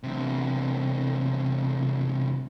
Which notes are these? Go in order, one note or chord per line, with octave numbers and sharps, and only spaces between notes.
E2 C3